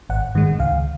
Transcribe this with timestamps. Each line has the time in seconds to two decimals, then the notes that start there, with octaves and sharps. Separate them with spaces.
0.10 G#1 F#5
0.35 G#2 D#3 G#3
0.59 C#2 F5